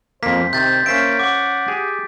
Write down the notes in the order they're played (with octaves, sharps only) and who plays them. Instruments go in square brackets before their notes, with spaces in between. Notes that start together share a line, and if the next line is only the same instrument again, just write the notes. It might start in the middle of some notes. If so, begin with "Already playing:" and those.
[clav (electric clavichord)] F2 A#3 [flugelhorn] C5 [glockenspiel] B6
[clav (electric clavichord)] C3 D#3 [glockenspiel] G6 A6
[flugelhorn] A#3 [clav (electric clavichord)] C#4 C5 E5 [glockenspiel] B6 D7
[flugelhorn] F#5 [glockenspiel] D6
[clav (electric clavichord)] G4 G#4